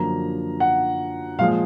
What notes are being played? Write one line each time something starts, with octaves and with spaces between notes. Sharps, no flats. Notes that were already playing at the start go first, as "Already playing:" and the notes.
Already playing: F#2 D3 F3 A#3 A#5
F#5
A#2 F3 G#3 F5